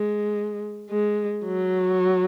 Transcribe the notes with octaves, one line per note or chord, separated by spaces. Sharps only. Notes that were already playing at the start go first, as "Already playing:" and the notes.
Already playing: G#3
G#3
F#3